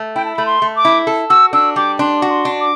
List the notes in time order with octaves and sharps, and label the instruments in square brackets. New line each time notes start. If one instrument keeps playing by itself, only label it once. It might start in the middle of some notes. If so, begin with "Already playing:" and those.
Already playing: [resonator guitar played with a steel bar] A3
[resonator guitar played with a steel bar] E4 [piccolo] G5
[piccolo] A5
[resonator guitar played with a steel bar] A3 [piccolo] B5
[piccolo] C6
[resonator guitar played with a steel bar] A3
[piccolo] D6
[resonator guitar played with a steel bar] E4
A4
[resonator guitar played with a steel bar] F#4 [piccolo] E6
[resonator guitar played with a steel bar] D4 [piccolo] E6
[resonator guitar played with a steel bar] G3 [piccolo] D6
[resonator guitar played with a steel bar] D4 [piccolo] C6
[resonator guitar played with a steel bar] F#4
[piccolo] C6
[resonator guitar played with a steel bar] D4
[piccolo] D6